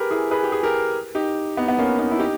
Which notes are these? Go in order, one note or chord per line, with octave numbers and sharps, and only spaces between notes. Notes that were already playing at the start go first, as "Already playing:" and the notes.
Already playing: G4 G#4 A#4 B4
E4 G#4
G#4 B4
G4
G#4
G4 A#4
D#4 G4
B3 D#4
B3
A#3 C#4
B3 D#4
E4
D#4 G4